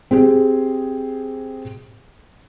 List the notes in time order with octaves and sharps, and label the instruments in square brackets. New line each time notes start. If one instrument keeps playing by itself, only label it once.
[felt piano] C4 G4 G#4